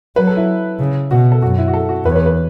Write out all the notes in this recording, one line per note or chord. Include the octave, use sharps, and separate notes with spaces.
F#3 B4
A4
E4
C#3
B2 F#4
A4
F#2 F#4
E4
F#4
A4
F#4
E2 B4
C#5
B4
B4